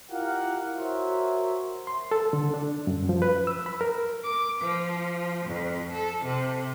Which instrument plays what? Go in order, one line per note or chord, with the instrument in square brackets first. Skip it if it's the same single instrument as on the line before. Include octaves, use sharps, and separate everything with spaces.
[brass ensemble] E4 F4 G4 A#4 F5 F#5
F#4 A#4 C5 C#5 E5
[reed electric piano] C6
A4
D3
D4
F#2
F3
B4
E6
B5
A#4
[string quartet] D6
F3
F2
A4
C3